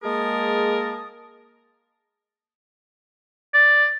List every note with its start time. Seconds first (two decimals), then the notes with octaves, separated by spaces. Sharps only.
0.03 G#3 A#3 G#4 A#4 A5 D#6
3.54 D5